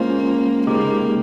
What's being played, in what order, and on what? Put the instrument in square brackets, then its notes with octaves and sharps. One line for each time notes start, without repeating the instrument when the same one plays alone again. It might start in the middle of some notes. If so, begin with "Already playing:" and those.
Already playing: [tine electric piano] G#3 C#4 F4 C5 [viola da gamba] A#3
[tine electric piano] C#3 G#3 D#4 G4 [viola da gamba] A#3